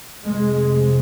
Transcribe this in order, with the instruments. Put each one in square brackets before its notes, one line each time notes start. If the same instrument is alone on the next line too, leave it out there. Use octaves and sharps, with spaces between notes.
[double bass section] F2 C3 G#3
G#3